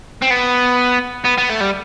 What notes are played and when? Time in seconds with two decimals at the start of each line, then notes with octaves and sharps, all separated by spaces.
0.22 C4
0.31 B3
1.25 B3
1.38 B3
1.50 A3
1.61 G3